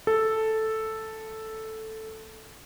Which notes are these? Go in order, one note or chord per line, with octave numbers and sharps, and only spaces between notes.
A4